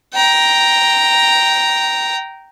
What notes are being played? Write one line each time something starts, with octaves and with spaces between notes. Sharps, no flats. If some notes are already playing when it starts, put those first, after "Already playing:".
G5 A#5